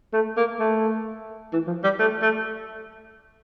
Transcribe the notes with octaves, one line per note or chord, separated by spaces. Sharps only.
A3
A#3
A3
E3
F3
G3
A3
A3